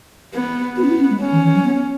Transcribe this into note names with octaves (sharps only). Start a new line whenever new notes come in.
B3
B3 F#4
C#4
E4
C#4
G#3
C#4
E3
E3
F#3
B3